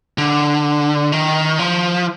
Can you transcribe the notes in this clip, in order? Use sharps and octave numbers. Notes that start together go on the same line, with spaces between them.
D3
D#3
F3